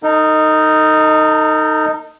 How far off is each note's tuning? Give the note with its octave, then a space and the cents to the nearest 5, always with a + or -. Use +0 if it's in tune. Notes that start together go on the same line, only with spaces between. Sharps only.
D#4 +0 A4 +45